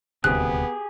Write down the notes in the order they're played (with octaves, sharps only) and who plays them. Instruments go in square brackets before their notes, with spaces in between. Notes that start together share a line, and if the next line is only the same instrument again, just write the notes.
[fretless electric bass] D#1 D2 C3 [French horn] B3 [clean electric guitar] G4 G#4 [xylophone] F#6